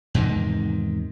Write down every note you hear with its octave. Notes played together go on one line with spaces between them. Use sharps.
E2 G#2 C3 D#3